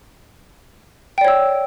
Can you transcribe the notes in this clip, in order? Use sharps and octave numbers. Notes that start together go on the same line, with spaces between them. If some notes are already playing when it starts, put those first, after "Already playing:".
C#5 D5 G5 E6